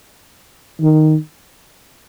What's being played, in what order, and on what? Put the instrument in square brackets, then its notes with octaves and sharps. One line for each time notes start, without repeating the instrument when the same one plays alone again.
[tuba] D#3